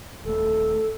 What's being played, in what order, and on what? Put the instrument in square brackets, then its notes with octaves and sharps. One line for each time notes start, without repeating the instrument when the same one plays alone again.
[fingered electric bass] D#1 A3 [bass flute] A4